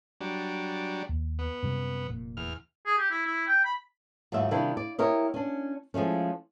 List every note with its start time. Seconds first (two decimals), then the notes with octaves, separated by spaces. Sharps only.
0.21 F#3 G3 D4
1.09 D#2
1.39 B3
1.63 F#2 C3 G3
2.08 F1 A#2
2.37 E2 F6
2.86 G#4
2.98 G4
3.11 E4
3.26 E4
3.47 G5
3.64 B5
4.32 D#2 G#2 F#3 F4 E5
4.51 C3 D#3 G3 D4 E4 F4
4.77 D5
4.99 E4 G4 A#4 C#5 D#5
5.34 C#4 D4
5.94 F3 G#3 A3 C#4